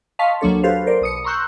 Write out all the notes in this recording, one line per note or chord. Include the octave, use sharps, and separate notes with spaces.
D#5 F5 A5 C6 C#6 B6
D2 F#3 A#3 D4 A4 C#5
F#4 G4 A4 B4 C5 F5
A#4 C5 D5
B1 D#6 C#7
A#5 C6 C#6 E6 F#6 G6